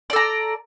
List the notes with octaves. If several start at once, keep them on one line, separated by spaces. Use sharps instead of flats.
A4 D5 A#5